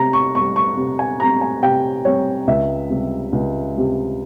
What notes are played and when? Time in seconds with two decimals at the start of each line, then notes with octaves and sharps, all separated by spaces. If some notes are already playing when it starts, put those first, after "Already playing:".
Already playing: C3 C4 A#5
0.13 C#6
0.35 C4 C#6
0.39 G3
0.56 C#6
0.77 C3
0.99 G#5
1.20 G3 A#5
1.24 C4
1.41 G#5
1.63 C3 G5
2.05 G3 C4 C#5
2.47 C#2 E5
2.90 C3 G3
3.33 C#2
3.75 C3 G3